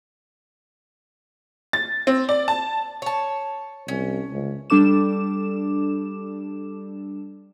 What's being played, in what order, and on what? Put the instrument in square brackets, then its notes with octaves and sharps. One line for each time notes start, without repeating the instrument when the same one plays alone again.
[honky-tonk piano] A6
C4
D5
A5
[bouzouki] C#5 A5
[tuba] C2 [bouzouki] C#4
[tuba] C#2
[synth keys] G3 D4 A4 D6 E7